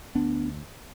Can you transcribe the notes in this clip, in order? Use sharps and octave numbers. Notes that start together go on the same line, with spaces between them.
D2 B3 D4